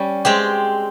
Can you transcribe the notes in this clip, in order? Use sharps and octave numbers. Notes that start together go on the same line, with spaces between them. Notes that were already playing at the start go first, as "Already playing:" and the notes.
Already playing: G3 C#4
G#3 C4 G4